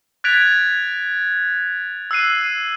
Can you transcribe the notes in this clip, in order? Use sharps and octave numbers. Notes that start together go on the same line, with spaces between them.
F#6 G#6 A6 B6 D7 F7
E6 F#6 C7 D#7